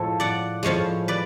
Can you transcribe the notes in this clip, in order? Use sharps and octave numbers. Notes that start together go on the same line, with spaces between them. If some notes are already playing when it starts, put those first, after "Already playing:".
Already playing: A2 F3 G#3 A4 C#5
D5 F#5
A2 F3 G#3 C#5 F5
B4 D5